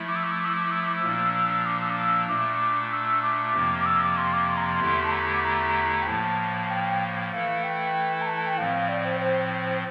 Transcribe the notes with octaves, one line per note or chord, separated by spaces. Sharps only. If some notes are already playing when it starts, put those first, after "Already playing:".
Already playing: F3 A3 E4
D6
E6
D6
E6
D6
E6
D6
E6
D6
E6
A#2 F3 A#3 D4
E6
E6
D6
E6
D6
E6
A#2 A3 D4 D6
E6
D6
F2 C3 F3 A#3
D6
E6
D6
C6
D6
C6
A#5
C6
E2 D3 A3 E4 G4
A5
A#5
D6
A#5
G5
A2 F3 A#3 A5
G5
E3 A3 E4 A4 F5
G5
A#5
A5
A5
G5
A2 F3 C4 F5
D5
C5
C5